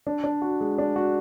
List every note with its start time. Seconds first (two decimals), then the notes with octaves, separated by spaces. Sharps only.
0.07 D4
0.24 D4
0.42 F#4
0.61 G#3
0.78 D4
0.96 F#4